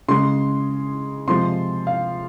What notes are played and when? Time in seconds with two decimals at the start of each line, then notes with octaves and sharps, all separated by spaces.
0.08 C#3 G#3 C6
1.27 C3 F3 G#3 C6
1.87 F5